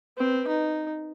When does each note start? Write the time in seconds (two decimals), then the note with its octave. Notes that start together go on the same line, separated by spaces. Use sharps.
0.17 C4 B4
0.48 D#4